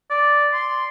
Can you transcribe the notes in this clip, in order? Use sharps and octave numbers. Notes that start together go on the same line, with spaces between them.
D5
C6